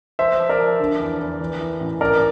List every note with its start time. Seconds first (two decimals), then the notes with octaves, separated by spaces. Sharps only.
0.19 F3 C5 E5
0.39 F3
0.49 A#4 D5
0.59 F3
0.80 D3
0.99 E2
1.20 E2
1.40 E3
1.60 E3
1.80 A1
2.01 A1 A#4 D5